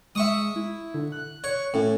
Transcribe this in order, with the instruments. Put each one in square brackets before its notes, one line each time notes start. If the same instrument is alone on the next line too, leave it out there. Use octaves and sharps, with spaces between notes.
[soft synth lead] G#3 [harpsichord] E5 C#6 D#6
[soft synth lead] E4
D3
F#6
[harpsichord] C#5
[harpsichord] A2 [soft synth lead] C#4